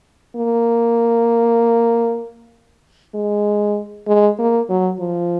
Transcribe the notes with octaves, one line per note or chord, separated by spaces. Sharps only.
A#3
G#3
G#3
A#3
F#3
F3